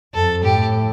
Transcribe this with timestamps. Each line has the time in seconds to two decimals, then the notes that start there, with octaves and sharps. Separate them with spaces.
0.14 F2 A4
0.43 A2 G4